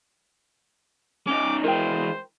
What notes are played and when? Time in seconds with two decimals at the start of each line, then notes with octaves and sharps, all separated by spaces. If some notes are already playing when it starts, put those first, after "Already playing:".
1.27 C#4 D#4 D6
1.64 E3 G#3 A#4 C5 G5